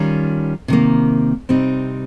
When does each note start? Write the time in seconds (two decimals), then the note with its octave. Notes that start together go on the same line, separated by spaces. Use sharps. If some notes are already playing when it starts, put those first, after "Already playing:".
Already playing: D#3 G3 C#4 F4
0.68 C3 D#3 A#3
1.49 C3 G3 C4 D#4